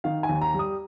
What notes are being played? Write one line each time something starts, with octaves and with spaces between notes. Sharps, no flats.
D#3 F5
G#5
D#2
A#5
G3
D#6